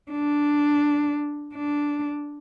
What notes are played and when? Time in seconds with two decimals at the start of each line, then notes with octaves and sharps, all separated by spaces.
0.11 D4
1.55 D4